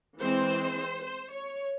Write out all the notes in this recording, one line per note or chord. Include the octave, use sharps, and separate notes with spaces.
E3 G#3 C4 C5
C5
C#5